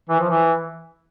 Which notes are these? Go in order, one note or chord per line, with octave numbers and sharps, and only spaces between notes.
E3
F3
E3